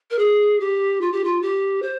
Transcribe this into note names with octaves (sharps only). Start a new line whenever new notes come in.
A#4
G#4
G4
F4
G4
F4
G4
C5